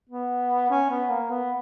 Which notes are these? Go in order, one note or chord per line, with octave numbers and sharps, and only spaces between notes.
B3
C#4
B3
A#3
B3